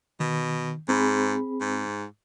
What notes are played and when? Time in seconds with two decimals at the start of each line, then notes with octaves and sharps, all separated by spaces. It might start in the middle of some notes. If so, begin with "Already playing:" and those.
0.20 B2 D#3
0.89 G#2 C4 G#4 B5
1.61 G#2